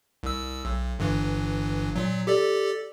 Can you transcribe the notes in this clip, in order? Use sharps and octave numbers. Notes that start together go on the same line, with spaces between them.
C2 E6
B1
G1 G2 E3
A#2 F#3
G4 A4 D5